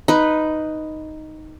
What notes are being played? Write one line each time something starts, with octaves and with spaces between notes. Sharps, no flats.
D#4 B4